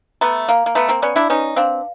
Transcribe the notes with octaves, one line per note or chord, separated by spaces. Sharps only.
A3 B3 A#5
A#3 F5
A#3
A3 B3 A#5
A#3 C4
B3 C#4 D5
D4 E4
C#4 D#4 B4
C4 D4 F5